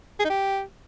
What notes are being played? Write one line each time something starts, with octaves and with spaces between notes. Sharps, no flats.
G#4
D#4
G4